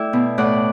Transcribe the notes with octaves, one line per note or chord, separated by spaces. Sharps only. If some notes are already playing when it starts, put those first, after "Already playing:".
Already playing: A3 E4 D5 E5 G5
B2
A2 D5 F#5